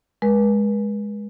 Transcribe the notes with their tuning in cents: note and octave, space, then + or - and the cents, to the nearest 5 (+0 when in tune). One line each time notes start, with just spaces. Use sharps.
G#3 +0 B4 -40